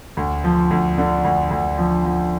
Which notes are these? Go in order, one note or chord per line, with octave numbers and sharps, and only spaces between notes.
D2
F3
D2
D3
D2
D2
F3
F3